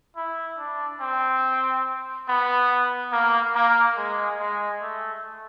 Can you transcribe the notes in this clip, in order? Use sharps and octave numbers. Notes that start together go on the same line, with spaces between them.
E4
D4
C4
B3
A#3
A#3
G#3
G#3
A3